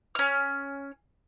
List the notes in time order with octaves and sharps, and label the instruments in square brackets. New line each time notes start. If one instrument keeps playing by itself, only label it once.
[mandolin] C#4 F6